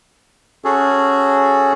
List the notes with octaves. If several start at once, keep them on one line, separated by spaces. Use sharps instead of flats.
C#4 F#4 G#4 A4